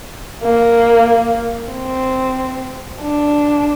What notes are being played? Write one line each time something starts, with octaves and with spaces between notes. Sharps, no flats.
A#3
C4
D4